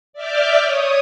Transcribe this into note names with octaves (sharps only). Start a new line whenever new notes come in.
D5 E5 D6 F6 G6
C#5 D#6